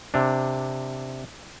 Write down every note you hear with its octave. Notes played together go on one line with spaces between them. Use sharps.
C3 D4